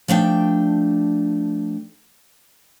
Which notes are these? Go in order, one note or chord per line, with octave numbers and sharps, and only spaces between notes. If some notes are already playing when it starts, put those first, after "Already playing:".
F3 A3 D4 G5